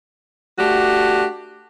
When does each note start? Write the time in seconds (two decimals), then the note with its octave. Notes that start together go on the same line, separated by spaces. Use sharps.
0.58 A3 D4 F#4 G4